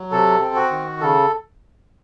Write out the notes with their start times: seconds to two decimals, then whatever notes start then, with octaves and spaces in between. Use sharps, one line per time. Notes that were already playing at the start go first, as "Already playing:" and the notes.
Already playing: F#3
0.12 C3 A4
0.41 C4
0.56 F#4
0.71 D#3
1.01 C#3 A4